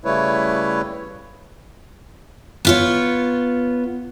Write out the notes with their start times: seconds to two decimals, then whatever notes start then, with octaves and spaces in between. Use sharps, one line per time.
0.05 C#3 G3 A3 E4 B4 C#5
2.65 B3 F4 C#5